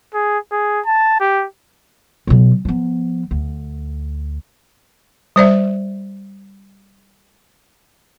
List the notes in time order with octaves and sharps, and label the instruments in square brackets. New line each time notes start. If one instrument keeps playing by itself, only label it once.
[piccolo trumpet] G#4
G#4
A5
G4
[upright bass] B2 F#3
F3 B3
D2
[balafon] G3 C5 D5 E5